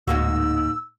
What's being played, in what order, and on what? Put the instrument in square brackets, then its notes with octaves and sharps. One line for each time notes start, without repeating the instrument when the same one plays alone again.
[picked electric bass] D1 [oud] G#2 A#3 F#4 [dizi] E6